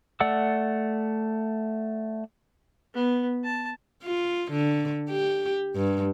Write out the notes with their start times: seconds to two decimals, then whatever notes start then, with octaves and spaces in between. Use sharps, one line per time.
0.20 A3 D5 F#5 E6
2.94 B3
3.44 A5
4.04 F4
4.52 D3
5.10 G4
5.76 G2